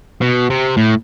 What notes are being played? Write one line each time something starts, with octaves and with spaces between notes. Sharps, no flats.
B2
C3
A2